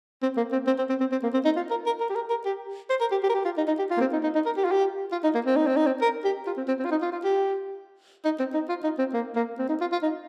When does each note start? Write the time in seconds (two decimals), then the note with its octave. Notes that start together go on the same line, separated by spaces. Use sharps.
0.23 C4
0.37 A#3
0.52 C4
0.67 C4
0.78 C4
0.89 C4
1.00 C4
1.12 C4
1.23 A#3
1.34 C4
1.45 D#4
1.56 F4
1.71 A#4
1.86 A#4
2.00 A#4
2.10 G4
2.15 A#4
2.30 A#4
2.46 G4
2.90 C5
3.01 A#4
3.12 G4
3.23 G4
3.29 A#4
3.35 G4
3.45 F4
3.57 D#4
3.67 D#4
3.79 G4
3.90 F4
3.97 A#3
4.01 C4
4.13 D#4
4.23 D#4
4.35 D#4
4.46 A#4
4.57 G4
4.65 F4
4.71 G4
5.12 F4
5.24 D#4
5.34 A#3
5.45 C4
5.56 D#4
5.67 C4
5.77 D#4
5.87 C4
6.01 A#4
6.24 G4
6.47 F4
6.57 C4
6.68 C4
6.80 C4
6.85 F4
6.91 D#4
7.02 F4
7.13 F4
7.24 G4
8.25 D#4
8.39 C4
8.54 D#4
8.69 F4
8.84 D#4
8.99 C4
9.14 A#3
9.36 A#3
9.59 C4
9.69 D#4
9.81 F4
9.92 F4
10.03 D#4